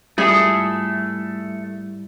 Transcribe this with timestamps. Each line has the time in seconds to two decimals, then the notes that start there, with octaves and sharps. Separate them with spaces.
0.18 G#2 G3 A3 E4 F4 G#4 D#6